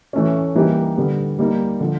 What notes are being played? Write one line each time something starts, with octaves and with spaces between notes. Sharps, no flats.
E3 A3 C#4
E3 G3 A#3 D#4 G4
D3 G3 B3
G3 A#3 D#4
D3 F3